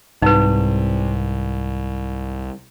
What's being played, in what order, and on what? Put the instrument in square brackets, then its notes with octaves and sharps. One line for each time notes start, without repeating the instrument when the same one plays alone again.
[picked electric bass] C2 [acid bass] G#2 [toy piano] D#4 B4